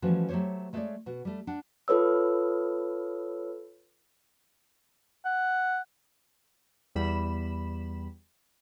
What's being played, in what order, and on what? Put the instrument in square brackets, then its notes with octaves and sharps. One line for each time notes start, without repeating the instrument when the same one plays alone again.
[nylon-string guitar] E3 F3 G3 A3 C#4 F#4
F#3 A3 G4 C5 C#5
G#3 A3 B3 G#4 C#5 D5
B2 F#4
G3 A3
D4 F#5
[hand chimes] F4 A4 B4 C#5 E6
[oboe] F#5
[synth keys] E2 G3 B5 E7